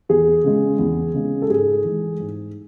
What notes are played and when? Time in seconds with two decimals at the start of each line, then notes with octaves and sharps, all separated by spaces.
0.09 E2 G#4
0.44 C#3 G#3
0.79 E2
1.14 C#3 G#3
1.42 A4
1.50 G#2 G#4
1.84 E3 G#3
2.19 G#2